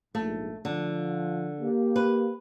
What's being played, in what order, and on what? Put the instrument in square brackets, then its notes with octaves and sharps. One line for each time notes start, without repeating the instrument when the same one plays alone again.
[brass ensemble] A#1 G#2 [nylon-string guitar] A3
[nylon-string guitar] D3 [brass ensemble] F3
[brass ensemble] A#3 G4
[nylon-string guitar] B4